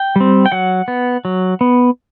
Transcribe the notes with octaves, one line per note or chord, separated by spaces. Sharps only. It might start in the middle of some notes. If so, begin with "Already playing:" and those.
Already playing: G5
G3 C4
G5
F#3 F#5
B3
F#3
B3